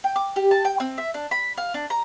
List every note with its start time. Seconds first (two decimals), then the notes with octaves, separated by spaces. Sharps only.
0.04 G5
0.16 D6
0.36 G4
0.51 A5
0.65 G5
0.80 C4
0.98 E5
1.14 D4
1.31 B5
1.58 F5
1.74 D4
1.90 A#5